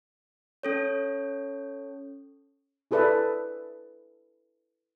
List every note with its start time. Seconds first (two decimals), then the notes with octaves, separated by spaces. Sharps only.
0.63 C#4 A4 C#5
2.91 E4 G#4 A4 B4 D5 E5